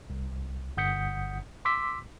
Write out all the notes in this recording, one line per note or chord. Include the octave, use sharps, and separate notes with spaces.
C2
G1 F#5 D#6 G6 B6 C#7
C6 D6 E6 B6